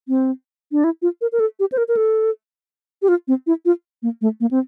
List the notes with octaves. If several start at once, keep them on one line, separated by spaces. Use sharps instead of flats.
C4
D4
E4
F4
A#4
A#4
A4
G4
C5
A#4
A#4
A4
G4
F4
C4
E4
F4
A#3
A3
A#3
C4